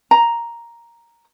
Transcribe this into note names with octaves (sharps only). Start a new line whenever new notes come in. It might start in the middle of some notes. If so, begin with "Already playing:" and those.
A#5